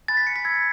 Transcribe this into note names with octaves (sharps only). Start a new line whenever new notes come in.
G#5 B5 F#6 A6
B6
C#7
B6
B5 E6 G#6